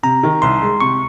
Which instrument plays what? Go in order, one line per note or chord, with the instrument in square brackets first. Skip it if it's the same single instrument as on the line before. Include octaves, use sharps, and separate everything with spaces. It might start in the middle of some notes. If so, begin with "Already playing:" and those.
[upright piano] C3 [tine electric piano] A#5
[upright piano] D#3
[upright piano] C2 [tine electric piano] C6
[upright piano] G#3
[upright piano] C3 [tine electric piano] C#6